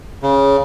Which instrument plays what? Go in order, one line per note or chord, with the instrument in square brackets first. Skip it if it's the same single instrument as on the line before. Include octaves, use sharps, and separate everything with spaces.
[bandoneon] C#3